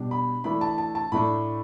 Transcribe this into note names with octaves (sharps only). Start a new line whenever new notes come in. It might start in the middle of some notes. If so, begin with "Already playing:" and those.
Already playing: B2 G3 D4
B5
E3 A3 D4 B5
A5
A5
A5
A2 A3 D4 B5